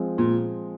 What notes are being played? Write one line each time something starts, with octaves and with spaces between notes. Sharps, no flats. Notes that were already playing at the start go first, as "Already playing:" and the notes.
Already playing: F3 G#3 C4
A#2